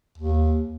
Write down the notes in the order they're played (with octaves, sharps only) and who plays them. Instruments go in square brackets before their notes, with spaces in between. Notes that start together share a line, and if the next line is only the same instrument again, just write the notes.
[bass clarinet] D#2